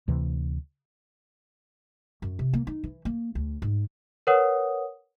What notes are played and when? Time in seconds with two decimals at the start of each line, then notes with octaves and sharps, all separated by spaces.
0.08 D2 C3 E3
2.22 F#2
2.39 C3
2.53 A#3
2.67 D#4
2.84 E3
3.05 A#3
3.35 D2
3.62 G#2
4.27 A#4 B4 C#5 F#5 D#6